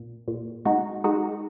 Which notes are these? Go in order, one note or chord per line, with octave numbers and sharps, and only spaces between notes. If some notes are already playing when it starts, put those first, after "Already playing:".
Already playing: A#2
A#2
G#3 D#4 F#4
G#3 D#4 F#4